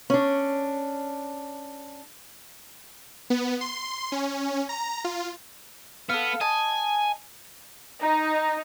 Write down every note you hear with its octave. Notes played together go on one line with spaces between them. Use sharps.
C#4 D4
B3
C6
C#4
A#5
F4
B3 A4 F5
D#5 G#5 A5
D#4